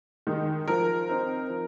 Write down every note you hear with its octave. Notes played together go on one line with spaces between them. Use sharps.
D#3 G#3 D#4
F3 A#4
C4 D#4
F3